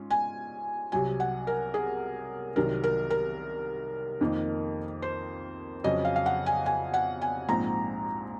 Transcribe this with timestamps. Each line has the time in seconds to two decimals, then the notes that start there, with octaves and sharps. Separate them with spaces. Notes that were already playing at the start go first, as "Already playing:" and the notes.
Already playing: G#2 C#4 F4
0.10 G#5
0.92 C2 C3 F#3 G#5
1.20 F#5
1.47 A#4
1.74 G#4
2.56 C2 C3 D#3 F#3 A#4
2.84 A#4
3.10 A#4
4.21 F2 D#3 A#3 D#4
5.02 C5
5.84 F2 C#3 F#3 C#4 D#5
6.05 F5
6.16 F5
6.26 F#5
6.46 G#5
6.66 G#5
6.94 F#5
7.22 G#5
7.48 A#1 G#2 F3 C4 A#5